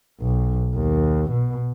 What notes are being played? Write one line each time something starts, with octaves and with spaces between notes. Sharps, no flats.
B1
D#2
B2